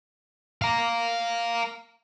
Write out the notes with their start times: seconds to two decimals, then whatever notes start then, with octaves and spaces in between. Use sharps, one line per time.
0.62 F5 A#5